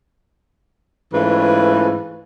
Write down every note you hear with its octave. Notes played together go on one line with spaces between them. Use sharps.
G#2 E3 A3 C#4 F4 B4